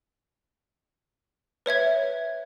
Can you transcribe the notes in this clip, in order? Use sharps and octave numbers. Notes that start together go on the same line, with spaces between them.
B4 C#5 E5 G#6